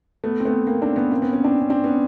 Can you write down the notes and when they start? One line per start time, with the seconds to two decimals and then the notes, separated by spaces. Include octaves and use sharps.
0.24 A3 B3
0.40 C4
0.45 A3 B3
0.67 A#3 C4
0.82 C4 D4
0.96 B3 C#4
1.11 A#3 C4
1.22 B3 C#4
1.33 B3 C#4
1.44 C4 D4
1.60 C#4
1.70 C4 D4
1.84 B3 C#4